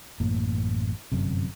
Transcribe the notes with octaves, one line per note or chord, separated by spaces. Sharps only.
A1 F#2 A2 A#3
G1 F#2 C3